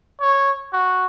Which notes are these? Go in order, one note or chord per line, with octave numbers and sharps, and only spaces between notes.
C#5
F#4